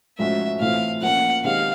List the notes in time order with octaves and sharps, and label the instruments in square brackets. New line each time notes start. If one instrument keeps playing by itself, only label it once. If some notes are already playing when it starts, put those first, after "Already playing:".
[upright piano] G#2 F3 A3 C#4 F#4 [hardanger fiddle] E5
[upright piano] A2 E3 A3 C4 F4 [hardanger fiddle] F5
[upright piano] F3 A#3 C#4 [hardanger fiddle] F#5
[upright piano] D#3 G#3 C4 D#4 G4 [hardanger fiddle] F5